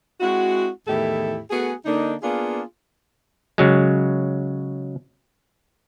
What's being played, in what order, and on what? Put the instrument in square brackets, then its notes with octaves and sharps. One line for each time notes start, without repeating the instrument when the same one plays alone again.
[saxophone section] G#3 C4 E4 F#4
E2 A2 D#3 E4 G4 A4
A3 B3 F#4 G#4
D3 A#3 D4 D#4
A#3 B3 D4 F4 G#4
[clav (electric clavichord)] C#3 F#3 G#3